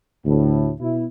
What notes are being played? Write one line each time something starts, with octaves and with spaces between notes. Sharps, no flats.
D2 A2
B2 E4